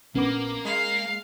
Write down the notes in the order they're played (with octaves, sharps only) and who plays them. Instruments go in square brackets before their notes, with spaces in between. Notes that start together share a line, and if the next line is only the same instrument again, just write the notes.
[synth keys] A#1 B3 D6 [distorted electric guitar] A#3 [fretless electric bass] C#4
[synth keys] G#3 [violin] F5